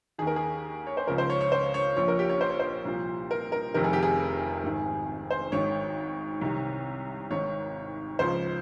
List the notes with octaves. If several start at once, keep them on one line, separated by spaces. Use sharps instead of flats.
D#2 D#3 G#4
A#4
G#4
C#5
C5
C#2 C#3 F3 A#4
C5
C#5
C#5
C5
C#5
A#1 A#2 F3 C#5
A#4
G4
C#5
C5
C#5
C5
C2 A#2 F3
A#4
A#4
F1 F2 C3 D#3 A#4
G#4
G4
G#4
G#1 G#2 D#3
C5
G#1 G#2 D#3 C#5
C2 C3 D#3
G#1 G#2 D#3 C#5
C#2 C#3 F3 C5